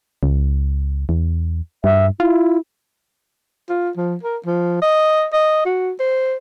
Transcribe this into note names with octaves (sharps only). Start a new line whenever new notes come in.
C#2
E2
G2 E5
E4 F4
F4
F3
A#4
F3
D#5
D#5
F#4
C5